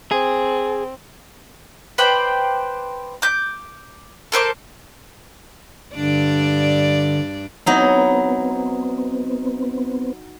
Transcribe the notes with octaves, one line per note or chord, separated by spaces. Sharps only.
C4 G#4
B4 C5 D5 G5
D6 G6
A4 A#4 C5 D6
G2 D3 D4 D5
F#3 B3 C4 D#4 E4